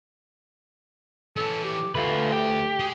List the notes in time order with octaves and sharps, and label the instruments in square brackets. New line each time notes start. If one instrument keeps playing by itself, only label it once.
[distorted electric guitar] E3 C#4 [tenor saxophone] A4
[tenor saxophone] G4
[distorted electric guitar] D2 [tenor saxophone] A3 [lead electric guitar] F4 B4
[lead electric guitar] G4
[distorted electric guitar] G#4 D#5